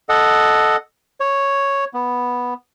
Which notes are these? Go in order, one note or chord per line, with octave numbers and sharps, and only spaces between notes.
A4 D#5 F#5
C#5
B3